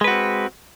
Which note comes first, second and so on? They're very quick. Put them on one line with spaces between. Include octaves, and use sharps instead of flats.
G#3 B4 F#4 C4